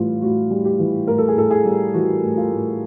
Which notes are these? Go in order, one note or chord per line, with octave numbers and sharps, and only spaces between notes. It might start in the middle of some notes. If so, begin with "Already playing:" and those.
Already playing: A2 E3 G3 F4
A2 F#4
G3
G4
E3
A2 A#4
A4
G#4
A2 A4
G#4
G3
E3 F#4
A2
F4
A2